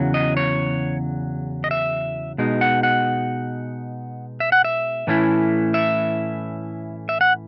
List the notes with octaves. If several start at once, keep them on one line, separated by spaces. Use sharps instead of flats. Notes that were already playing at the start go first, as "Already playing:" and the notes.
Already playing: E2 C#3 F#3
D#5
C#5
D#5
E5
B2 G#3 D#4
F#5
F#5
E5
F#5
E5
A2 E3 A3 C#4 E4
E5
E5
F#5